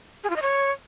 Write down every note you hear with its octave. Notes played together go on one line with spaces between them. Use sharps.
G#4
F4
D#5
C#5